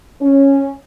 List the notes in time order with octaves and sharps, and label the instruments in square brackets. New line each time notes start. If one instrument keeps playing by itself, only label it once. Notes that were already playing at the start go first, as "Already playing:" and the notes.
[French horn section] C#4